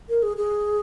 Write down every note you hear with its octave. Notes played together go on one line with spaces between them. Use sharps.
A#4
G#4
G#4